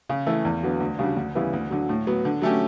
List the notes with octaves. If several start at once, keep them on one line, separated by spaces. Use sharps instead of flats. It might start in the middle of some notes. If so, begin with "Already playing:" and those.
C#3
E3 A3
E2
D3 F#3 B3
D2
C#3 G3 D4 F#4
D2
C#3 E3 G3 B3
D2
D3 F#3
A2
F#3 B3
D3
F#3 A3 C#4 G4